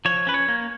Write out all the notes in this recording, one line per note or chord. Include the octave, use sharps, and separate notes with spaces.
F3 C#5
C#4 B4
C#5
A#3